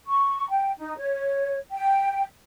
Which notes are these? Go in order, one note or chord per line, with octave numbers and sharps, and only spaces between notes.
C#6
G5
D#4
C#5
G5